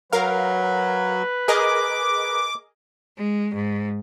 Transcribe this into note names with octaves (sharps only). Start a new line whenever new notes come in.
F#3 A#4 B4 F5
G#4 A#4 D#5 D6
G#3
G#2